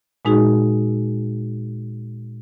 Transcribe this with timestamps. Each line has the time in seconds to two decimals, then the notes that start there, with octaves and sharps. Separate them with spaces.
0.25 A#2 G#3 D#4 F#4 G#4